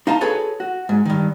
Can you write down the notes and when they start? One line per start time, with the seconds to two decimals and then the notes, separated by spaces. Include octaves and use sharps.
0.07 D#4 F5 A5 A#5
0.21 F#4 G#4 A4 B4 C#5 G#5
0.60 F#4
0.89 G#2
1.05 G2 D#3